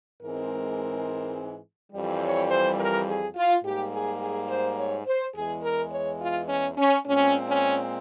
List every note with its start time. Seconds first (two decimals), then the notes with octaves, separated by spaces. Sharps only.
0.22 G#2 E3 G#3 C4 A#4
1.93 F2 E3 G3
2.22 C#5
2.50 C5
2.79 A#4
3.07 G#4
3.36 F4
3.64 G#2 G3 A#3 G4
3.93 G#4
4.21 G#4
4.49 C5
4.78 C#5
5.07 C5
5.35 E2 E3 G#3 G#4
5.63 A#4
5.92 C#5
6.21 F4
6.49 C#4
6.77 C#4
7.06 A#2 G#3 C4 C#4
7.49 C#4